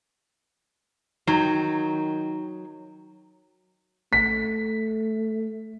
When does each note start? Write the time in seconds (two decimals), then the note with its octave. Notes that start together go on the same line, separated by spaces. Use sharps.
1.27 D#3 F#3 D#4 G5 A#5
4.13 A3 B6